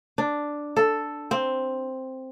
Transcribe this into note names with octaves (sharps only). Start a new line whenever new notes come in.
D4
A4
C4